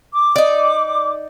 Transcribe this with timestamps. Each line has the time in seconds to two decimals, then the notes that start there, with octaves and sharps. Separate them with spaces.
0.12 D6
0.36 D#4 D5